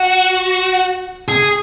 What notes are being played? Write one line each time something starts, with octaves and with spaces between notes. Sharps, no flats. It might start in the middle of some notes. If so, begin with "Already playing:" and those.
Already playing: F#4
G#4